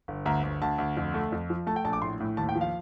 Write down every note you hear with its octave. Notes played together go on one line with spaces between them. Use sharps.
G1
D2 A#5
D2
D2 A5
D2
F2
A3
F2
F3
A3 A5
G5
A#1 A5
D6
A2 C6
A2
D#2 A5
G5
F3
F5